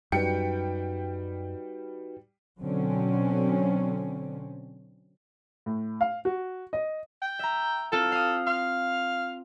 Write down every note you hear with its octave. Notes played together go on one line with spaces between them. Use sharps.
F#2 G3 D#4 F#4 B4 G5 C#7
B2 D3 F#3 C4 C#4
A2
F5
F#4
D#5
G5
E5 A#5
C4 F4 A4
F5 D#6
F5 C6